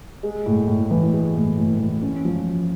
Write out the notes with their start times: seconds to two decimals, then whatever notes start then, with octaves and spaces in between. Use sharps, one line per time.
0.23 G#3
0.46 A2
0.67 A2
0.91 E3
1.13 G#3
1.35 A2
1.58 A2
1.79 E3
2.02 C#4
2.25 F3